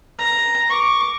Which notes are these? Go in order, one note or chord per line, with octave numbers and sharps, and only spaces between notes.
A#5
C#6 D6